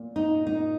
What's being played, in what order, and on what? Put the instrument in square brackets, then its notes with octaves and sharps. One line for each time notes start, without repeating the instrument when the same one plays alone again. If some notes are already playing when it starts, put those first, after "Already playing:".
Already playing: [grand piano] A#2
[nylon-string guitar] D#4
D#4